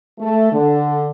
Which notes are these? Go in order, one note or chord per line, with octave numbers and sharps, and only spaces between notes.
A3
D3